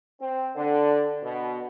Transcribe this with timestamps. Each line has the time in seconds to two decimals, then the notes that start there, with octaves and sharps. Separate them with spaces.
0.19 C4
0.55 D3
1.24 B2